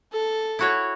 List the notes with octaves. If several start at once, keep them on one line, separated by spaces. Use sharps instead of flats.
A4
E4 F#4 C#5